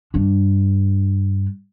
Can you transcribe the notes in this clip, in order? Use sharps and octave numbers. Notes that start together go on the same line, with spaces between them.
G2 D4